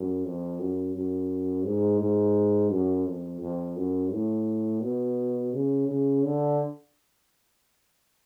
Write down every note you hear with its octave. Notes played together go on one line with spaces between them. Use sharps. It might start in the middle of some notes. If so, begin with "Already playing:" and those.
Already playing: F#2
F2
F#2
F#2
G#2
G#2
F#2
F2
F2
F#2
A2
B2
C#3
C#3
D3